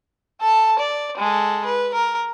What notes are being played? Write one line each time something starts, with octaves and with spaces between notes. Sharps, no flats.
A4 A5
D5
G#3 A4
B4
A#4